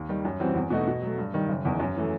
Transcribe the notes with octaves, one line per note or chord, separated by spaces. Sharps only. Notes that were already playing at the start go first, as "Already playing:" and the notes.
Already playing: D#2
D#3 G3
F#2
E3 G3 C4 F#4
E2
B2 A3 D#4 F#4
B2
F#3 A3
G2
D#3 G3
F#1
E2 D#3
F#2
E3 A3